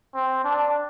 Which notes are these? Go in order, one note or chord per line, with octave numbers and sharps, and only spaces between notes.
C4
D4